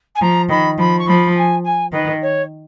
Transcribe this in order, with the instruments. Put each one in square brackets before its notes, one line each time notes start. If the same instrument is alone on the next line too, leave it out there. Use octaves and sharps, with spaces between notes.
[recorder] G#5
[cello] F3 [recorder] A#5
[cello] D#3 [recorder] B5
[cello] F3 [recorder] B5
[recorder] C#6
[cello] F3 [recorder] B5
[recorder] G#5
G#5
[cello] D#3 [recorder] B4
[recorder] C#5